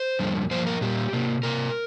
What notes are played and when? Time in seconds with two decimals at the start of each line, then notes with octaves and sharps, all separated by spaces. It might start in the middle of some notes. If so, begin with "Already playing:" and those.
Already playing: C5
0.19 F2 D3 G3 A#3
0.51 G2 F3 A#3 C5
0.67 A#4
0.81 A#2 G3 A#3 G4
1.13 C3 A#3
1.43 C3 A#3 A#4